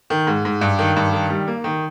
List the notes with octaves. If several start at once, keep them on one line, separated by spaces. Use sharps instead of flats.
D#3
G#2
G#2
G2
D#3
G2
D#3
G3
A#3
D#3